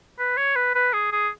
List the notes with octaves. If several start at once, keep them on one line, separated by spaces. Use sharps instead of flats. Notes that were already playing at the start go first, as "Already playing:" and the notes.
B4
C#5
B4
B4
G#4
G#4